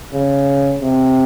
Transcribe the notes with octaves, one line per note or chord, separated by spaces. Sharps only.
C#3
C3